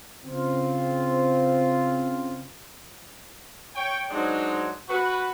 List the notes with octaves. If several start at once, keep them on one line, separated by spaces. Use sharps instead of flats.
C#3 C4 F4
C#5 G5
F#3 G#3 D4 D#4 C5 C#5
F#4 B4